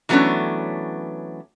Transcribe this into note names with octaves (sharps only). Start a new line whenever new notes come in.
E3 F#3 A3 B3 C#4 D4